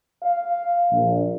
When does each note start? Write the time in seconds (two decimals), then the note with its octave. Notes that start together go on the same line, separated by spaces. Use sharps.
0.23 F5
0.91 A#1